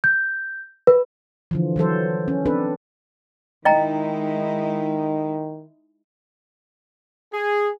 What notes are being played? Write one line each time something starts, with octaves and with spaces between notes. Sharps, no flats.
G6
B4
D3 E3 F3
E3 F#3 A4 C5
C#4
C4 D4 A4 B4
D#3 G#3 D#4 E4 D#5 G5 A#5
G#4